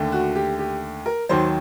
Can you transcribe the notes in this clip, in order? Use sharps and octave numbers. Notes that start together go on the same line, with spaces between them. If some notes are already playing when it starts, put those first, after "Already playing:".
Already playing: D#2 D3 A3
F#4
G4
G4
A#4
D#2 D#3 F#3 C5